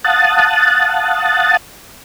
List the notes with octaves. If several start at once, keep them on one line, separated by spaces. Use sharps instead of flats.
F5 F#5 A5 D#6 F#6 A6